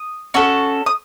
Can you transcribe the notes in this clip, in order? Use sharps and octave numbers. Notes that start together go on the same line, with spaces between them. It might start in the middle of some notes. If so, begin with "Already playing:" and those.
Already playing: D#6
C#4 F#4 A4
D#6